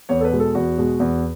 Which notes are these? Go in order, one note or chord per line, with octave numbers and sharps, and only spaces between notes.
E2 C#5
A4
B4
B2 G#3
A4
E2 F#4
B2 G#3
E2